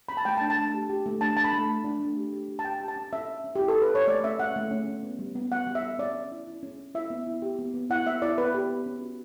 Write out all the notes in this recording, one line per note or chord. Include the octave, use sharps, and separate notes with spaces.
C#4 B5
A5
A3 G5
A5
D4
A5
A3
G4
G4
A3
D4 A5
D4 A5
B5
A3
A3
D4
A3
G4
G4
G4
A5
G4 G5
G4
A5
C#4
C#4 E5
C#4
C#4
G4
E4
A4
C#4
B4
C#4 C#5
A3 D5
C#4 E5
C#4 F#5
A3
C#4
C#4
B3
G3
B3
G3 F#5
G3
E5
G3
C#4 D5
C#4
E4
E4
C#4
C#4
E4 E5
B3
E4
G4
B3
B3
E4 F#5
B3 E5
E4 D5
B3 B4
G4
B3
C#4
F#4